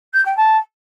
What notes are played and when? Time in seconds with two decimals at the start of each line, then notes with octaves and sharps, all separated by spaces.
0.13 G6
0.25 G5
0.37 A5